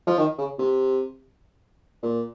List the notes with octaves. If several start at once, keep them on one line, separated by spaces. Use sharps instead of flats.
F3
D#3
C#3
C3
A#2